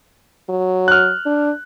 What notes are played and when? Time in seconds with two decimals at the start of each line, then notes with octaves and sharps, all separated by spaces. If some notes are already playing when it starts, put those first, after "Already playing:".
0.49 F#3
0.88 F6 F#6
1.26 D4